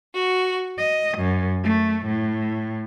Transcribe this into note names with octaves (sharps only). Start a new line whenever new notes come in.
F#4
D#5
F#2
A3
A2